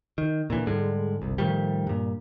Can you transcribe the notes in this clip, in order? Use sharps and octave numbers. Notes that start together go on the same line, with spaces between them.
D#3
A#2 D3 E3
G#2 D3 G3 G#3
G1 C2
A2 D#3 F3 G3
G2 A#2